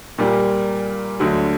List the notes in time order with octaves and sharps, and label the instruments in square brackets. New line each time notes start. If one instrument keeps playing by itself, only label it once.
[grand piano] A#2 G3 A#3
D2 D3 F#3